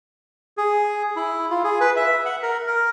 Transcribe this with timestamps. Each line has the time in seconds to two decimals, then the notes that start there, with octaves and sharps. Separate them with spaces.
0.58 G#4
1.16 E4
1.50 F4
1.64 G#4
1.81 B4
1.96 E5
2.26 F#5
2.43 A#4
2.67 A#4